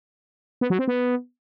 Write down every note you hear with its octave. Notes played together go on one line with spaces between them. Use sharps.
B3
F#3
C4
B3